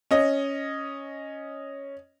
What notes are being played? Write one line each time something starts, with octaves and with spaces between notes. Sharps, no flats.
C#4 D#5